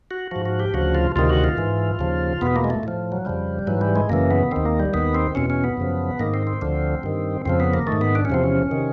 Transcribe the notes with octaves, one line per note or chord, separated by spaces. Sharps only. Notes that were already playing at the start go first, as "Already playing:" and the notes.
F#4
G#2 F3 F#4
F#4
G4
D2 C#3 F3 F#4
F4
D2 C3 D#3 F4
F#4
F4
G#2 E3
D#2 C#3 F3
E2 B2 B3
A#3
G#3
A3
A2 F3
F#3
F2 C#3 F3 G3
G#2 E3 F#3
G3
G#3
F#2 C#3 E3 A#3
B3
D#2 D#3 C4
A#3
G3
D#2 D#3 B3
C4
E2 B2 C#4
C#4
B3
F#2 C#3 F3
G#2 D#3 A#3
C4
C4
D2 D3 F3
G2 D#3
F2 C#3 F3 C4
B3
A#3
D#3 A3
G#2
B3
D4
C#4
E2 C3 F3 C4
C#4
C3 D#3